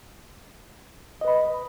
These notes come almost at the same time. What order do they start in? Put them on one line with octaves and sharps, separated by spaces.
D#5 B4 B5